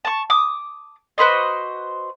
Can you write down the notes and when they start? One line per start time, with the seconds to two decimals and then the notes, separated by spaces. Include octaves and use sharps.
0.05 A5 C#6
0.30 D6 D#6
1.18 F#4 B4 C5 D#5